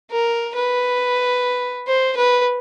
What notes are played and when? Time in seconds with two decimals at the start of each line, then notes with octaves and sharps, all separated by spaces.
0.11 A#4
0.56 B4
1.87 C5
2.17 B4